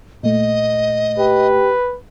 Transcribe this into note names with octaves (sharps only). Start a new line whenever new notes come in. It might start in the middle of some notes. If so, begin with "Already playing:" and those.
A#2 A3 D#5
G4 B4